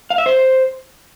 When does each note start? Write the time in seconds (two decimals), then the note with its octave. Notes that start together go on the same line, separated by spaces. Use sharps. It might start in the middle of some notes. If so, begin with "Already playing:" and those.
0.10 F5
0.18 E5
0.26 C5